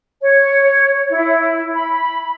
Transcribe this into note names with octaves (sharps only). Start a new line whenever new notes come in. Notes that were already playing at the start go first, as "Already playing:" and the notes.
C#5
E4
B5